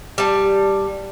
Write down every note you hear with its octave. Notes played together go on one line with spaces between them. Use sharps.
G3 A5